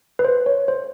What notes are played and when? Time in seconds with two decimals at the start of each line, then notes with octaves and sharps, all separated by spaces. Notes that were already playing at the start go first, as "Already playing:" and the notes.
0.19 B4
0.24 C5
0.46 C#5
0.68 C5